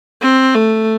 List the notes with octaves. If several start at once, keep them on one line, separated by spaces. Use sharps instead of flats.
C4
A3